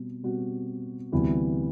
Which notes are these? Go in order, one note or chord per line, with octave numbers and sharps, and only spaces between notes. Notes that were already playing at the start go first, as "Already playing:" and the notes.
Already playing: B2 G3 C4
B2 G3 C4 F#4
D2 C3 E3 G3 B3